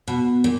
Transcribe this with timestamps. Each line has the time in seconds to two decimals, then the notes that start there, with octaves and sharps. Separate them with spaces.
0.08 B2
0.44 A#2